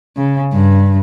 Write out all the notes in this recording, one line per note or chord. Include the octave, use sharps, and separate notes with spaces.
C#3
G2